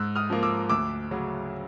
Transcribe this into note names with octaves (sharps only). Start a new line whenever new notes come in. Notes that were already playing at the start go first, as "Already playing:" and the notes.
Already playing: G#2 E6 F#6
D#6 F6
F3 A#3
D6 E6
D2 D6 E6
C#3 F#3